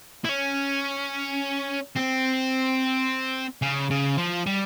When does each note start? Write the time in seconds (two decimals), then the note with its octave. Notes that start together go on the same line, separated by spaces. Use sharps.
0.25 E4
0.29 C#4
1.96 C4
3.62 C#3
3.90 C#3
4.17 F3
4.46 G3